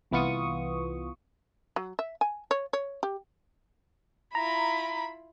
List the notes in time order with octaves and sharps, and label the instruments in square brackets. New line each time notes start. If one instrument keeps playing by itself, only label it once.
[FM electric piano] C2 E3 B3 F4 C#6 D#6
[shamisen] F#3
E5
G#5
C#5
C#5
G4
[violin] E4 F4 [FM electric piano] A#5 [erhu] B5